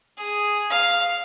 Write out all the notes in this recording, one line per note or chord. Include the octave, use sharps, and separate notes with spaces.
G#4
F5